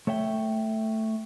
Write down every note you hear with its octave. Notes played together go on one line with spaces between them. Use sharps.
A3 C#5 E5 G5